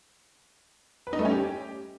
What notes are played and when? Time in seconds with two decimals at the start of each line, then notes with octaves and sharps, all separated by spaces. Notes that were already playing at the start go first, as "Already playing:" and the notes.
1.07 B4
1.13 D#4
1.19 A3
1.25 C#4
1.31 G4